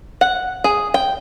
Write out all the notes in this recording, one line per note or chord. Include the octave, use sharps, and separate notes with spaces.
F#5
G#4
G5